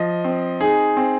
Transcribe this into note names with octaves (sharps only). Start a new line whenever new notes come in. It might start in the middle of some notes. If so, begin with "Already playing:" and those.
Already playing: F3 D#5
C4
D#4 G#4
C4